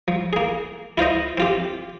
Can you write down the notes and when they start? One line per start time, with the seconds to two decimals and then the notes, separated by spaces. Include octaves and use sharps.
0.08 F3
0.33 A#3 G#4
0.98 E4 F4 C5 D#5
1.38 C4 F4 G4